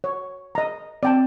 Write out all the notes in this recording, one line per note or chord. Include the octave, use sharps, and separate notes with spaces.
C#5
D#5 A#5
C4 D5 G5 A5